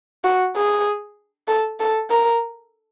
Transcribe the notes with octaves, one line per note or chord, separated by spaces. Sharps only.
F#4
G#4
A4
A4
A#4